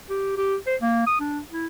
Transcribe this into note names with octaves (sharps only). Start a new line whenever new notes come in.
G4
G4
C5
A#3
D#6
D4
E4